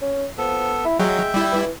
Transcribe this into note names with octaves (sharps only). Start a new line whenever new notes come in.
C#4
F3 B3 A4
E4
F#3 G#3 E5 G5
G3 E4
E3